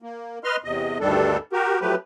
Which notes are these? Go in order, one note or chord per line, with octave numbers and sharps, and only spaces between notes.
A#3
B4 D#5 C6 F6
E2 C3 D#5
D2 G2 D#3 G3 D4 A4
F#4 G4 A#4
F3 F#3 A3 G4 B4